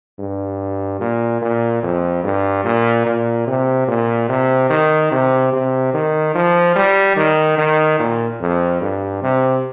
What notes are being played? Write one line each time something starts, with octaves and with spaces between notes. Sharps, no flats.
G2
A#2
A#2
F2
G2
A#2
A#2
C3
A#2
C3
D#3
C3
C3
D#3
F3
G3
D#3
D#3
A#2
F2
G2
C3